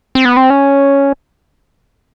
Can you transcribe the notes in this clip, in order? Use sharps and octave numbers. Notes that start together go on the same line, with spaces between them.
C4
B3
C4
C#4